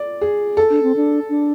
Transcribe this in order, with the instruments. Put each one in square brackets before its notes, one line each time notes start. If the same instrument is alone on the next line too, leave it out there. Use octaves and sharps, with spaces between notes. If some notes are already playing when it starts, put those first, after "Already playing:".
Already playing: [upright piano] D5
G#4
A4
[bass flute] D4
C4
D4
D4